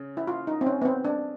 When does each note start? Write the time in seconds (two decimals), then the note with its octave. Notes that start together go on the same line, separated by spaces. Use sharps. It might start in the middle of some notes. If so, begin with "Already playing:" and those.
Already playing: C#3
0.17 E4
0.27 F4
0.47 D#4
0.61 C4
0.66 C#4
0.82 B3
0.85 C4
1.05 D4